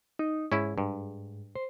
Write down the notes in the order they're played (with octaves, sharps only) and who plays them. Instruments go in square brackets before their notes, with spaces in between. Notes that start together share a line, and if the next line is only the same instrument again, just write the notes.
[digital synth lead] D#4
[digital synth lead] G#2 [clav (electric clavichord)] C#4 E4
[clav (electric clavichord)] G2
[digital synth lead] C5